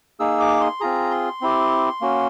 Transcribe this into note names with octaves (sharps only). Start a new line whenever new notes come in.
A#3 D#4 G#4 E6
D6
C6
C4 F4 G#4 A#5
C6
C4 E4 G4
A#3 C#4 F#4